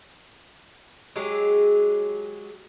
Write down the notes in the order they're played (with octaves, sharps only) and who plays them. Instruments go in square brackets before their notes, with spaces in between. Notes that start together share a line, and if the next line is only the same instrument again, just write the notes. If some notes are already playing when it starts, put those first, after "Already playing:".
[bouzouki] F#3 G#3 G4 G#4